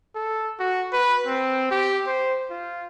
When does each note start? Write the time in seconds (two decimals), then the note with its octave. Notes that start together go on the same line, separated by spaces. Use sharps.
0.15 A4
0.60 F#4
0.93 B4
1.27 C4
1.71 G4
2.07 C5
2.50 F4